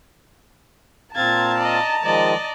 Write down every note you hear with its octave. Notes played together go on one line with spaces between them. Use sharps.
A#2 C4 F5 A5 A#5 G#6 A6
D5 D#5
D#3 F3 G#3 D5 D#5